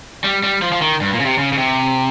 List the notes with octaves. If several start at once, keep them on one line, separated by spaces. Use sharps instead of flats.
G3
G3
F3
F3
D#3
G2
A#2
C#3
C3
C#3
C#3
C3